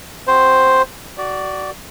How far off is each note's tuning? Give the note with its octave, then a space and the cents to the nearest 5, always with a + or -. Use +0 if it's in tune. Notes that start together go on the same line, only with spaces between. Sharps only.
C4 +0 F#4 +0 C5 +0
F#4 +25 D5 +0